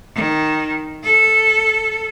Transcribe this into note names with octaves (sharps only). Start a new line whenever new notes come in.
D#3
A4